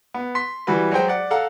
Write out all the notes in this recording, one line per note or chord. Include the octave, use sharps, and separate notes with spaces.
B3
C6 B6
E3 G3 F#4 B4
F#3 G#3 C5 G5
D5 F#5
A4 F5 F#5 A#5